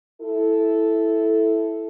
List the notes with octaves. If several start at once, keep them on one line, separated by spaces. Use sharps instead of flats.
E4 A4